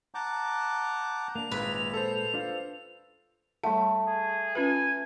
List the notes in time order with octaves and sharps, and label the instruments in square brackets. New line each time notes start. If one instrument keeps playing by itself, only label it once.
[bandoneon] F#5 A5 A#5 D6 G6
[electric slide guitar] A#3 D4 [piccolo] F7
[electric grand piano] G#1 [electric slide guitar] A#2 G#3 F4 [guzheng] B4
[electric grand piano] A4 C5
[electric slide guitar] D4 F4 F5
[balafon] G3 F#5 [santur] A3
[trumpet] G#4
[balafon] C#4 F4 B4 [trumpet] G#5